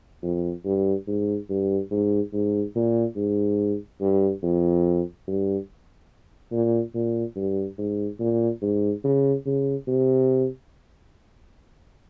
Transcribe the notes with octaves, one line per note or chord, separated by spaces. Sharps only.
F2
G2
G#2
G2
G#2
G#2
A#2
G#2
G2
F2
G2
A#2
A#2
G2
G#2
A#2
G#2
C#3
C#3
C3